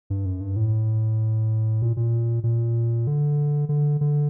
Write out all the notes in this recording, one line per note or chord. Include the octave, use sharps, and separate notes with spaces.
G2
F#2
G2
A2
A#2
A#2
A#2
D3
D3
D3